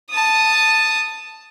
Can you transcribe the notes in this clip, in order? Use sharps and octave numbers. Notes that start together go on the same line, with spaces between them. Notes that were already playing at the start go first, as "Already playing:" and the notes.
A5 D#6